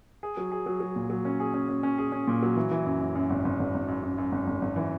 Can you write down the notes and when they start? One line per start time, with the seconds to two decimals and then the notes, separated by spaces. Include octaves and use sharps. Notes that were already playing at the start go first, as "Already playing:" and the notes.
0.23 G#4
0.37 F#3
0.52 G#4
0.66 F#3
0.80 F#3
0.96 A#2
1.10 F#3
1.25 C#4
1.40 G#4
1.54 C#4
1.69 C#4
1.83 C#4
1.98 G#4
2.12 C#4
2.27 A#2
2.43 F#3
2.56 E3
2.71 E3
2.86 F#2
3.01 F#2
3.15 F#2
3.30 G#1
3.45 G#1
3.59 G#1
3.74 G#1
3.88 F#2
4.03 F#2
4.18 F#2
4.32 G#1
4.47 G#1
4.62 G#1
4.76 E3